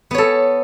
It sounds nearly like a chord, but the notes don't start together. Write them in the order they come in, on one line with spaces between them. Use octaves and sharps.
B3 C#5 A4